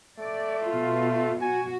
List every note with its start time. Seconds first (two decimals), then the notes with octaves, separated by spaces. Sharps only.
0.19 A3 D5
0.66 B2 F4
1.42 F#4 G#5